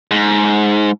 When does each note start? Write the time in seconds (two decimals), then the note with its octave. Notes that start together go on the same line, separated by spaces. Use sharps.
0.11 G#2